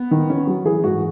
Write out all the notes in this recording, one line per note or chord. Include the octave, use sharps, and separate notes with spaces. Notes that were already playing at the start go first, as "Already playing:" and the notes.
Already playing: B3
D#3
C#4
F#3
E3 G#4
G#2 F#4